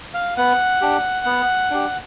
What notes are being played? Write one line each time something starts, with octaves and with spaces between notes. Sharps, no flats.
F5
B3 F#5
D4 G4
B3
D4 G4